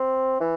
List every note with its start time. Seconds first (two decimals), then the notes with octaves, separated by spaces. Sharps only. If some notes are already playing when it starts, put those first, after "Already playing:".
Already playing: C4
0.41 E3